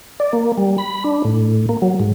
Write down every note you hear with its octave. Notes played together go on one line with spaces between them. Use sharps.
D5
A#3
G3
B5
D4
A2
A#3
F#3
G#2